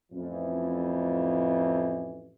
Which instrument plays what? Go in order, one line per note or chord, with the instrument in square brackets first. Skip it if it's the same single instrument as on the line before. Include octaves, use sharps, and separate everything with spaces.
[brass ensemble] A1 F2 E3